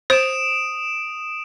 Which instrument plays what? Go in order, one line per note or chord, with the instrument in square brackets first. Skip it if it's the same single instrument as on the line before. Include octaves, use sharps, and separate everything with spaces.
[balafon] C5 [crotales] D#6 D7 E7